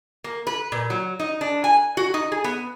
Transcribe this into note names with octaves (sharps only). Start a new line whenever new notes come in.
A#3
B4
A#2
F#3
D#4
D4
G#5
F#4
D#4
G#4
B3